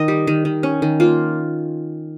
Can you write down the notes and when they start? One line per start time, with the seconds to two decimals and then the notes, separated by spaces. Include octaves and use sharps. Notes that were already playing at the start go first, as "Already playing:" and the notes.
Already playing: D#3 D#5
0.08 G3
0.27 D#3
0.45 D#3
0.63 C#4
0.82 D#3
1.00 A#3 F4